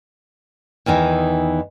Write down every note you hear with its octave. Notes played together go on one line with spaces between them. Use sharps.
E2 D#3 E3 D#4